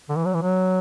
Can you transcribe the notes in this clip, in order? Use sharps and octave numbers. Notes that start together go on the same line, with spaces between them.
D3
E3
F#3
E3
F#3